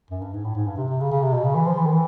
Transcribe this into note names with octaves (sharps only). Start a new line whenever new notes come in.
F#2
G2
G#2
A2
G#2
G2
C3
C3
C#3
C#3
C3
B2
C#3
E3
F3
E3
D#3
E3